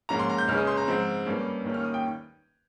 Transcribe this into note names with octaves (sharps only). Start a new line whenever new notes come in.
G#2 F3 A#3 C#4 A#5
C6
A#5
G6
C#2 C#3 G#3 C#4 F6
D#6
C6
A#5
G#2 F3 C4
G2 G3 A#3 C#4
D#2 D#3 A#3 C#4
F6
D#6
G5